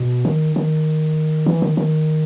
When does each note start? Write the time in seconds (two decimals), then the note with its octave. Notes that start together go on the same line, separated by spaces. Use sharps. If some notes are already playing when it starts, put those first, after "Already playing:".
Already playing: B2
0.25 D#3
0.56 D#3
1.46 E3
1.62 D#3
1.77 D#3